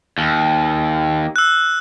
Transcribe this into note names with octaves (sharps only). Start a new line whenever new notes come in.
D#2
E6 F#6